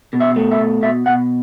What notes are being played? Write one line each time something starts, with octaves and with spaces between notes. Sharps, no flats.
B2
E5
A3
E5
B2
B2 E5
B2 F#5